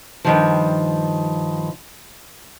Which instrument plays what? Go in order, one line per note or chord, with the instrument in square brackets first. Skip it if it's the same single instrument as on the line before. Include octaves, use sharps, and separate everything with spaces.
[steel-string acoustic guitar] G2 D#3 F3